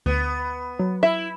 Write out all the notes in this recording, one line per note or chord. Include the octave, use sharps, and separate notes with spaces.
D2 B3
F#3
E4 E5